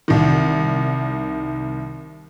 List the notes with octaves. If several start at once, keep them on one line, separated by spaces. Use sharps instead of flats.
C2 D#3